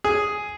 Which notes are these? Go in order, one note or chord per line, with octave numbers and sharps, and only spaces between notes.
G#4